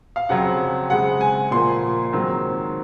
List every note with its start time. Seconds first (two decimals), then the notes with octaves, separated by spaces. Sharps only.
0.16 F5
0.29 F2 C#3 F#3 C4 F#5
0.90 C#3 G#3 C4 F#5
1.21 G#5
1.51 A#2 F3 A#3 C6
2.13 G#2 D#3 F#3 C4